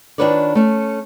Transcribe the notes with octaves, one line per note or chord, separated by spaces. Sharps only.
D#3 D4 F4 B4 C#5 D5
A3 C#4